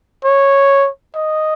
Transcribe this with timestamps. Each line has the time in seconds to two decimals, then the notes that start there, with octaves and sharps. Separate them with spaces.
0.25 C#5
1.16 D#5